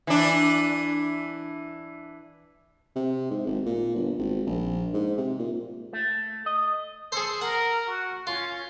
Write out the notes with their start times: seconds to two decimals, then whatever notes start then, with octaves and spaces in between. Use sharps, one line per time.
0.07 E3 D4
2.96 C3
3.31 G#2
3.47 G#1
3.66 A#2
3.95 G1
4.19 G#1
4.46 A#1
4.93 G#2
5.17 C3
5.39 A#2
5.93 A3
6.46 D#5
7.12 G#4 A4 C5
7.41 A#4 F#5
7.87 F#4
8.27 C#4 F4